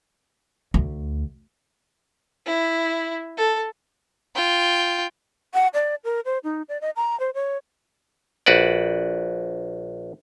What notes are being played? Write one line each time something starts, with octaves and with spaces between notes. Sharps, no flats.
D2
E4
A4
F4 G5
F#5
D5
A#4
C5
D#4
D5
D#5
A#5
C5
C#5
A#1 F#4 B4 D5